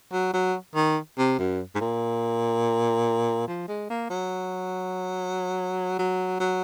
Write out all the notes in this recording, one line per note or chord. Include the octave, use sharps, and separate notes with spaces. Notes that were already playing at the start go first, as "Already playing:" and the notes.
F#3
F#3
D#3
C3
F#2
G#2
A#2
F3
G#3
A#3
F#3
F#3
F#3